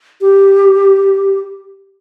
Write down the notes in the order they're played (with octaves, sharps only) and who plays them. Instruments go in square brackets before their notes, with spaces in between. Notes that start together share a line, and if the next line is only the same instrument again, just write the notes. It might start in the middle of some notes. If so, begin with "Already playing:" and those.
[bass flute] G4